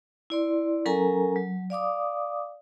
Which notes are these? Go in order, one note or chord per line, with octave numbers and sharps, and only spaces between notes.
E4 D5 C6
F#3 C#4 A4 A#4 G#5 A#5
F#3
D5 F5 D6 D#6